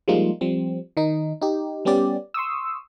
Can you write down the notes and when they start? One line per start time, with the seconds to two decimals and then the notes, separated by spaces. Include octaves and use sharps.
0.08 F3 G3 G#3 A#3 D#4 F4
0.41 F3 G3 C4
0.97 D#3 D#4
1.42 D#4 G4
1.85 G3 B3 C#4 G4 D5
2.34 C6 C#6 D#6 E6